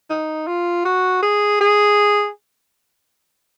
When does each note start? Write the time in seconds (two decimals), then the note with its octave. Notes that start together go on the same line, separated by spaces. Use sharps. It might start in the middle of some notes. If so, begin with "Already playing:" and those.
0.10 D#4
0.47 F4
0.85 F#4
1.22 G#4
1.61 G#4